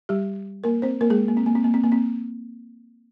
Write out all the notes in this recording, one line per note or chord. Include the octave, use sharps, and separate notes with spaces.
G3 G4
A#3 A#4
C4 C5
A#3 A#4
G#3 G#4
A#3
C4
A#3
C4
A#3
C4
A#3
C4